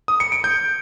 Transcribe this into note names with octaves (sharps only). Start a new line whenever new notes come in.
D#6
C#7
D7
G6